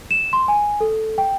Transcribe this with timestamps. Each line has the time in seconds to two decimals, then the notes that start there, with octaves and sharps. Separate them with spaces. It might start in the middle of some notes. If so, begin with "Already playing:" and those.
0.11 E7
0.33 C6
0.48 G#5
0.80 A4
1.18 G5